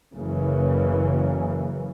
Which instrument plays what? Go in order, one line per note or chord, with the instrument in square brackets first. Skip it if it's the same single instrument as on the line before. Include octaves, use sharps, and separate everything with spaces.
[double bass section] F#1 C#3 E3 A#3